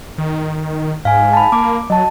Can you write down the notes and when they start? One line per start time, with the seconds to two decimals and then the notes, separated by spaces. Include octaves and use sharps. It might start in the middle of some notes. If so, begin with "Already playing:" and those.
0.18 D#3
1.05 G#2 F5 G#5
1.33 A5 B5
1.52 A#3 D6
1.90 F#3 D#5 A5